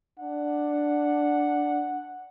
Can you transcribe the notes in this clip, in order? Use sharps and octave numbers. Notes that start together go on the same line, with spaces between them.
D4 F#5